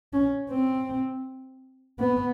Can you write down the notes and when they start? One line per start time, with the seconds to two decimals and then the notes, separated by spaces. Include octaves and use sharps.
0.13 C#4
0.51 C4
1.99 B3